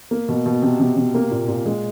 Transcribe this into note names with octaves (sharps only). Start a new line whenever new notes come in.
A#3
B2
B2
C3
C3
C3
A#3
A#2
A#2
G#3